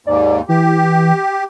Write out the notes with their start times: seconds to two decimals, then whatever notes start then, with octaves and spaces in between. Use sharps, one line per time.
0.07 D#2 G#2 D5
0.49 E3 G4